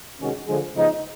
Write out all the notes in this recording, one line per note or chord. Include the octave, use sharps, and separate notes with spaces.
C3 D#3 G#3 C#4 F#4
D3 F3 G#3
C#3 F3 G#3 B3 D#4